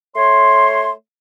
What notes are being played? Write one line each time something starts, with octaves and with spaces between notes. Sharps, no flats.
A3 C#5 C6